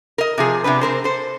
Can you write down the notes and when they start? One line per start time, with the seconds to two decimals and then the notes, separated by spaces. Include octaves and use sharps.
0.18 A#4 D#5
0.38 C3 F3 G#4
0.64 C3 B3 D4 B4
0.81 C4 A#4 C5
1.04 A4 C5